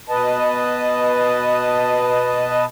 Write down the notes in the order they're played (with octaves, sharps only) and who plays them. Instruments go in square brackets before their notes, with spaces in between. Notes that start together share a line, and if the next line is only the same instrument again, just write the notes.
[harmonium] B2 B4 D#5 A5